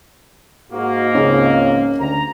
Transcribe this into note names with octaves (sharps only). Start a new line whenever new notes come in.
G#2 A#3 F#4
C#2 C#3 C4 C#4 D#4 G#4
D2 A#5